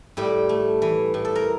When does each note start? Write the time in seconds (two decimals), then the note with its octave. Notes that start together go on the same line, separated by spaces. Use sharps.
0.17 A2 G3 G4
0.49 A3
0.82 E3
1.14 A2
1.25 A4
1.35 A#4